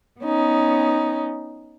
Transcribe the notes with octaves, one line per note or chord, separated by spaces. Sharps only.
B3 C#4 D#4